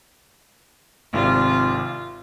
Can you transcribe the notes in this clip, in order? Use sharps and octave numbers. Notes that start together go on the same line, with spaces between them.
G#1 C3 F4 D5